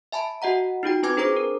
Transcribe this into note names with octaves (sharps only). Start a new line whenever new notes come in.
E5 G#5 A5 B5
F#4 D#5 F#5 A#5
D#4 F4 F#4 G5
C4 F4 B4 G#5 D6 G#6
D4 G#4 C5 A#5 D6
A#4